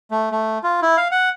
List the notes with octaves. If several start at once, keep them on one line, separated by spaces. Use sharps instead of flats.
A3
A3
F4
E4
F5
F#5